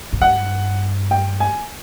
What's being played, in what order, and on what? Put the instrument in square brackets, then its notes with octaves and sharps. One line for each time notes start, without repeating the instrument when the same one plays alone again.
[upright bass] G#2
[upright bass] G2 [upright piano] F#5
[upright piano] G5
G#5